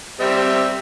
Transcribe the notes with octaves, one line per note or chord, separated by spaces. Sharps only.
G3 C4 E5